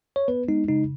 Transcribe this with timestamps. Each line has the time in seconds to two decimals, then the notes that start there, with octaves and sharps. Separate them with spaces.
0.16 C#5
0.28 B3 B4
0.48 G#3 D#4
0.68 C#3 D#4